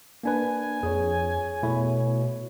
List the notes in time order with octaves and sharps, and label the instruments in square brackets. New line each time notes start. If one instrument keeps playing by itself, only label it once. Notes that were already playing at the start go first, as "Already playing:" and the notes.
[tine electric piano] A#3 D4 B4 [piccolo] G#5
[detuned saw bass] F2 [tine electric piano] G#4 C#5
[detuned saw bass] B2 [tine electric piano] A3 E4 C#5